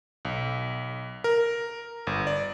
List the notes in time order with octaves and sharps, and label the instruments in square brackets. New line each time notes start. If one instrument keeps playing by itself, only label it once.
[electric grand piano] B1
A#4
G1
D5